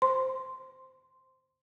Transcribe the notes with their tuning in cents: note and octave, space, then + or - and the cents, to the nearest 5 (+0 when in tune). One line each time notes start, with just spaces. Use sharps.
C5 +0 C6 -5